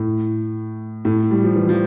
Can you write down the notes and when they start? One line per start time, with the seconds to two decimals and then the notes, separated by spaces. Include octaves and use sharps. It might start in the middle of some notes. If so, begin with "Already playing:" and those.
Already playing: A2
1.05 A2
1.31 G3
1.43 F3
1.56 E3
1.69 F3